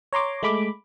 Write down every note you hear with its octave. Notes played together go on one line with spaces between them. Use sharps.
C#5 A#5 C6 D6
G#3 A3 B5 D6